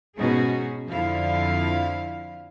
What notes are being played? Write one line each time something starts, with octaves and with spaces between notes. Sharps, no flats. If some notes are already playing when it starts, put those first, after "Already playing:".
G#2 B2 C#4 D#4 F#4 G#4
F2 D3 F3 E4 F5